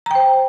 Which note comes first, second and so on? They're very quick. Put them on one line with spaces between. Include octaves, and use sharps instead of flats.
A#5 G5 C5